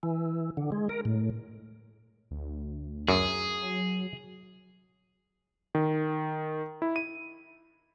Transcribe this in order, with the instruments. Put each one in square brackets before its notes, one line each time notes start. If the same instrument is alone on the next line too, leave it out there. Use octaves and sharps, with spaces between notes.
[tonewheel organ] E3
D3
G#3
A#4
A2
[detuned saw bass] D2
[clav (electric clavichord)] F#2 [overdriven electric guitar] G#4
[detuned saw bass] F#3
[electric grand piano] D#3
E4
D#7